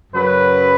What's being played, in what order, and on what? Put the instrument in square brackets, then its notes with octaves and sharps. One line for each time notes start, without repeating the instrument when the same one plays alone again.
[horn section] F#2 C#3 F#3 B4